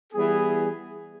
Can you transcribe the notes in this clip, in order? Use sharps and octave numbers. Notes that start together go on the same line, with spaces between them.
E3 G3 B3 E4 G#4